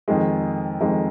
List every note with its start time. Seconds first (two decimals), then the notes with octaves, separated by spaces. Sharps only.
0.08 F2 D#3 G#3
0.81 F2 D#3 G#3